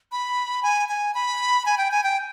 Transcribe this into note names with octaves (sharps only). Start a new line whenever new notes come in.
B5
G#5
G#5
B5
G#5
G5
G#5
G5